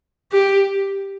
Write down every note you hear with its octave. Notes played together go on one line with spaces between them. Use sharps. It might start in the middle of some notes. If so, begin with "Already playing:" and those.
G4